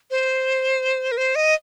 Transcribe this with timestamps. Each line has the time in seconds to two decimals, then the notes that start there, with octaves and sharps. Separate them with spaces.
0.11 C5
1.12 A#4
1.17 C5
1.35 D#5